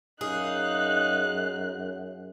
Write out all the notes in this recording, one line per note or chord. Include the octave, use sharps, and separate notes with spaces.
F#2 D#4 G#4 F5 F#6